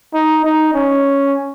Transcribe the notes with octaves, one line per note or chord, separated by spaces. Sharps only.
D#4
D#4
C#4